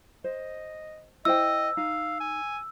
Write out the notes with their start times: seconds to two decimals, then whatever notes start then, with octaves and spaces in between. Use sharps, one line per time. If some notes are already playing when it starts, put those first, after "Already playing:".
0.24 C5 D#5
1.25 E4 C5 D#5 G5 E6
1.77 D#4 F5
2.20 G#5